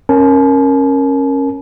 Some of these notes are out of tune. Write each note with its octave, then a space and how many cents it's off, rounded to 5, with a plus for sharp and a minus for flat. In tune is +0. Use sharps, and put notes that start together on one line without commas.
C#4 -20 A#4 +0 A5 -45